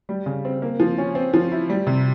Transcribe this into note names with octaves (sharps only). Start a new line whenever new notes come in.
G3
C#3
C4
A#3
F3
C#4
C4
F3
E4
G3
C3